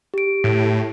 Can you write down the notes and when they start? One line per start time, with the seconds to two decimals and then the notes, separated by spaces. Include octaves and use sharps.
0.14 G4 D7
0.44 A2